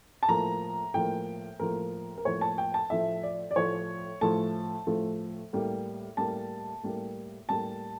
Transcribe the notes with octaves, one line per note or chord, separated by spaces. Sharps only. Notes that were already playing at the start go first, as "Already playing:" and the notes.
A5
A2 F3 A#3 A#5
A2 F3 A#3 G5
A2 F3 A#3 A#4
A#4
A2 F3 A#3 C#5
A5
G5
A5
A2 F3 A3 E5
D5
D5
A2 F3 A3 C#5
A2 F3 A3 A5
A2 F3 A3
A2 G3 A#3
A2 G3 A#3 A5
A2 G3 A#3
A2 G3 A#3 A5